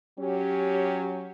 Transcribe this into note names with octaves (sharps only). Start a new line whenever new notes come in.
F#3 C#4 G4